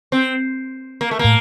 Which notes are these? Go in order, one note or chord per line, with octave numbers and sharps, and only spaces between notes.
C4
A#3
A3
A2 A#3